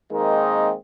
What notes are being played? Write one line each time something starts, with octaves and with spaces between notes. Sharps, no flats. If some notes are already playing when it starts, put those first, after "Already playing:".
D#3 G#3 A#3 C4 D#4